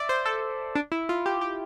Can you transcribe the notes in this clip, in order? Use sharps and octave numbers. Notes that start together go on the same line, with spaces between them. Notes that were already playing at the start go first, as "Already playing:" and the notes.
Already playing: D5 E5
C5
A4
D4
E4
F4
G4
G4